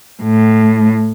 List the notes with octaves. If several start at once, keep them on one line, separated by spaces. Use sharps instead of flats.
A2